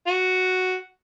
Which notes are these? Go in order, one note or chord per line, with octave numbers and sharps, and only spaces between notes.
F#4